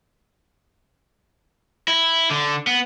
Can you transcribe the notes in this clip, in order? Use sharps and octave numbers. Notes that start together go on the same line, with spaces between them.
E4
D3
B3